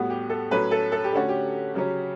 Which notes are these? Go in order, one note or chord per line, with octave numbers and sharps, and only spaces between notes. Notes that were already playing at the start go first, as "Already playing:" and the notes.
Already playing: A2 G3 B3 F#4
G4
A4
A2 F#3 A3 C#4 B4
A4
A4
G4
D3 A3 C#4 F#4
G4
C#3 F#3 C#4